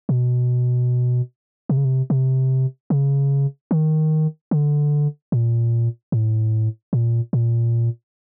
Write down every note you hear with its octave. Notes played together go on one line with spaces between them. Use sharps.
B2
C3
C#3
C3
C3
C#3
D#3
D3
A#2
A2
A#2
A#2